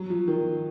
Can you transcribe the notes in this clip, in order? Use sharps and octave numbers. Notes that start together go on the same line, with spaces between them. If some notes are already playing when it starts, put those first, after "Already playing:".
Already playing: F#3
F3
D#3